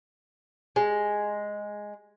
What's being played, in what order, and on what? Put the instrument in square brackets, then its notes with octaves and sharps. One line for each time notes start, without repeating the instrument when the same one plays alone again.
[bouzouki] G#3